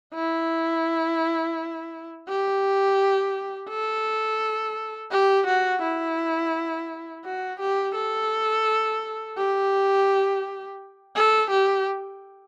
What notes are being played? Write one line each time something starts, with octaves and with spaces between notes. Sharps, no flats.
E4
G4
A4
G4
F#4
E4
F#4
G4
A4
G4
A4
G4